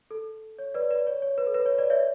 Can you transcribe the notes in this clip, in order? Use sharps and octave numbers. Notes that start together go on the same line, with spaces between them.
A4
C#5
B4 D5
B4 D5
C#5
C#5
B4
A4
B4
C#5
B4 D5
C#5 E5